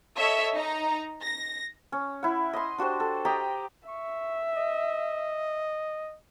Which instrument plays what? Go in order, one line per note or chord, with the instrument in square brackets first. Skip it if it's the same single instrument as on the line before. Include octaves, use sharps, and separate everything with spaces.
[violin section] A4 C#5 D#5 E5
D#4 A#5
A#6
[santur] C#4
E4 F#5
D#5 C6
D4 F#4 G4 C5
A4
G4 D#5 G5 A#5
[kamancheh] E5 [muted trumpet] C#6
[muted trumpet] D#5